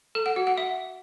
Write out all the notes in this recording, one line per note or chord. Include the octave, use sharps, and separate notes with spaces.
A4
F#5
F#4
F#5
E5